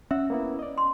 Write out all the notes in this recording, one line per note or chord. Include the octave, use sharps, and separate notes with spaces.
C#4 E5 F#5 E6
A#3 B3 E4
D5 D#5
C6